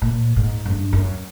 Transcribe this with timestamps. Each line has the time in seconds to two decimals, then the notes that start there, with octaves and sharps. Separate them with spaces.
0.02 A#2
0.36 G#2
0.65 F#2
0.71 G2
0.93 F#2